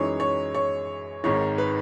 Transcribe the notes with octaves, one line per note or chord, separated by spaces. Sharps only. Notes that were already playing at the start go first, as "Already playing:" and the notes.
Already playing: F#2 E3 G#3 D#4 C#5
C#5
C#5
G#1 G#2 D#3 C#5
B4